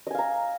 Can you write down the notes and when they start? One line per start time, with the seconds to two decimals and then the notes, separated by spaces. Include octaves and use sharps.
0.07 D#5
0.11 G#5
0.15 F5
0.18 A#5